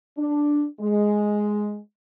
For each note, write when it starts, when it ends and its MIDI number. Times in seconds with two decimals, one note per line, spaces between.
0.17 0.66 62
0.80 1.79 56